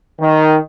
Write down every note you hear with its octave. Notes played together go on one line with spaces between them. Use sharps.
D#3